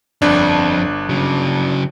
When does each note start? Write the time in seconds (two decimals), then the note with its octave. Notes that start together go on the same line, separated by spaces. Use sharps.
0.22 G1 F2 D4
1.09 C#3 F#3